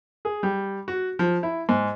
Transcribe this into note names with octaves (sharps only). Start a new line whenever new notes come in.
G#4
G3
F#4
F3
E4
G#2